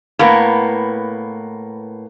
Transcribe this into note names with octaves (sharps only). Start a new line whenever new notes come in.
A2 A#3 B3